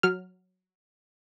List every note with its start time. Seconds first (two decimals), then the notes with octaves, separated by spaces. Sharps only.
0.03 F#3 F6